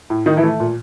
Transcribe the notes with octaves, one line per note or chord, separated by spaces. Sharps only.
A2
A2 D#3 D#4
E3 E4
A3
A#2